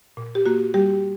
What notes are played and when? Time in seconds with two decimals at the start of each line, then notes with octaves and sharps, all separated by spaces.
0.17 A#2
0.35 G4
0.46 A#3 F#4
0.74 G3 G4